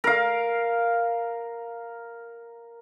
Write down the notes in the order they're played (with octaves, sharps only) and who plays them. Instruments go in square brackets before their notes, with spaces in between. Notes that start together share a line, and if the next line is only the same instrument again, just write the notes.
[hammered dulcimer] A#4 F5